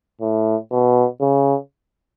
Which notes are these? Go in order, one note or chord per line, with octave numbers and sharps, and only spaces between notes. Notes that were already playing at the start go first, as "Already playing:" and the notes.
A2
B2
C#3